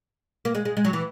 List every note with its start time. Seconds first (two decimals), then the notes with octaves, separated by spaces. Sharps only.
0.45 A#3
0.55 G#3
0.65 G#3
0.77 G#3
0.85 F#3
0.93 E3